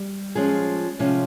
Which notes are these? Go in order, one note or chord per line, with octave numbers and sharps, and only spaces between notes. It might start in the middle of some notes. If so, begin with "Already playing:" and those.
Already playing: G3
F3 G#3 C#4 G#4
C3 F3 G#3 C#4